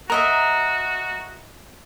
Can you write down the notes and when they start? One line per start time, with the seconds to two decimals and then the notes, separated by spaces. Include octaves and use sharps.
0.10 F#4 A#4 D#5 E5 A#5